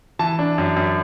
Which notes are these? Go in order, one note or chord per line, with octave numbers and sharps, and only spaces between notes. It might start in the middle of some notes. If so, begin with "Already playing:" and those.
E3 A5
D4
F#2
F#2